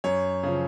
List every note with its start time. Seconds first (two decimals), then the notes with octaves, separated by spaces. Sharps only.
0.04 F#2 C#5
0.43 C#3 F3